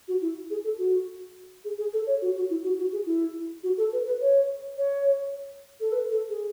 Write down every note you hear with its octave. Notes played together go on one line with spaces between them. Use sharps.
F#4
E4
G#4
A4
F#4
G#4
G#4
A4
C#5
F#4
F#4
E4
F#4
F#4
G#4
E4
F#4
A4
B4
B4
C#5
C#5
A4
B4
A4
G#4